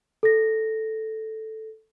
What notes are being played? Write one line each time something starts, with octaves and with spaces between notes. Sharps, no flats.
A4 A#6